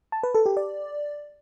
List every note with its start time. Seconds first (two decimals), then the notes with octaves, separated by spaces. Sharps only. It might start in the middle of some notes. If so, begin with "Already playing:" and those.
0.12 A5
0.23 B4
0.35 A4
0.46 G4
0.57 D5